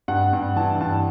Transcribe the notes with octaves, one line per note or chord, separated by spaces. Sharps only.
G2 F#5
G2
E3 A5
G2 A5